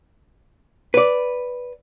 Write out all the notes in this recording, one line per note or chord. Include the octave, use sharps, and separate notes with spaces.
B4 D5